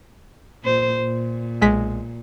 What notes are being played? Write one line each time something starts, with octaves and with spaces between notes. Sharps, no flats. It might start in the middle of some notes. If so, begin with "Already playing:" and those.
A#2 C5
A#2
B1 G#3 B6